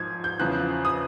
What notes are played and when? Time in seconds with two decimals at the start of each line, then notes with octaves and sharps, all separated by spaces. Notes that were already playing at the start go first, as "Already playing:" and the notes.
Already playing: G#2 F3 G#6
0.24 G6
0.40 E2 C#3 F3 F#6
0.85 D#6